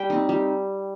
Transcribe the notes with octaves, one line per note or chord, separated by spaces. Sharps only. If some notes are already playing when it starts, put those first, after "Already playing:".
Already playing: G3 G5
C4 D#4
G3